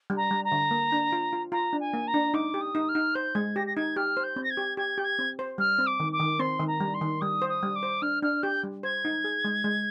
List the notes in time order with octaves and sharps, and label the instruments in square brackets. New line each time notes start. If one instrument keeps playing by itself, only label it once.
[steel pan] G3
[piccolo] A#5
[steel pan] G3
[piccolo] A#5
[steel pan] D3
A#3
D4
F4
F4
[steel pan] F4 [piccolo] A#5
[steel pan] D4
[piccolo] G#5
[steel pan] A#3
[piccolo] A#5
[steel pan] D4
[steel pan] D#4 [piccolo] D6
[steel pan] G4
[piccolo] D#6
[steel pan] D#4
[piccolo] F6
[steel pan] D#4
[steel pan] C5 [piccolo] G6
[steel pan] G#3 [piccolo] G#6
[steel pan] G4 [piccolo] A#6
[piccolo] A#6
[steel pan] D#4 [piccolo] G#6
[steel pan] G4 [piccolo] F6
[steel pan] C5
[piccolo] G6
[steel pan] C4
[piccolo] A#6
G#6
[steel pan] G4
[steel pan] G4 [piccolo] G#6
[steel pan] G4 [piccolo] G6
[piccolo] G#6
[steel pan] C4
C5
[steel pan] G3 [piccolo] F6
[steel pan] C4
[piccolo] D6
[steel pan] D#3
[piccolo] D6
[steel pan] D#3
[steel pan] C4 [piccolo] C6
[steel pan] D#3
[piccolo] A#5
[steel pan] G3
[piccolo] C6
[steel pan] D#3
[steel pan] G3 [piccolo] D#6
[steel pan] C5
[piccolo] D#6
[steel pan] G3
[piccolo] D6
[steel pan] C5
[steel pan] D4 [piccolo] F6
[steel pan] D4 [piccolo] F6
[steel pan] G4 [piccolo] G6
[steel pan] G3
[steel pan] C5 [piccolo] G#6
[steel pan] D#4
G#4
G#3
G#3